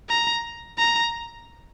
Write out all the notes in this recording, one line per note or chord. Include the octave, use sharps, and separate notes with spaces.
A#5
A#5